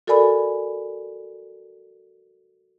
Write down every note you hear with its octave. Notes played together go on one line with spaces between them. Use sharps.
F#4 A4 A#4 D5 G#5 B5